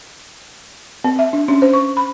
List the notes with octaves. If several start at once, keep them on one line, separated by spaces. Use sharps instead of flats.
C4
E5
D4
C#4
C5
C#6
B5